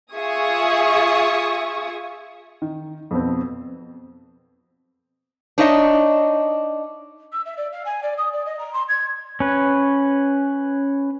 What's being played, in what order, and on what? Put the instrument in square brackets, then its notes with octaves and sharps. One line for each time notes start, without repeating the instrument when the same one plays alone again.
[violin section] F4 G#4 E5 C#6 D#6
[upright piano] D#3
F2 B2 B3 C4
[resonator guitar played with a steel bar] D4 D#4 C#5 D#5 E5
[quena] E6
E5
D5
F5
G#5
D5
D#6
D5
D#5
A#5
C6
G#6
[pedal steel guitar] C#4 B4